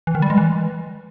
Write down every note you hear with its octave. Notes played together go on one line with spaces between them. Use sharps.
E3
D#3
G3
G#3
E3